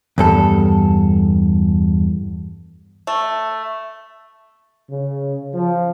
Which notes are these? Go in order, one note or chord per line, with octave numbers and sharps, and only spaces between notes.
E2 G2 A4
A3
C#3
F3